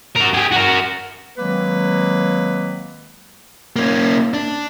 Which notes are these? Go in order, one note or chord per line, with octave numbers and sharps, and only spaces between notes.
F#4 A#4
G4 G#4
F#4 A#4
D#3 F#3 G#3 A#3 C4 B4
A#3 C#4
D4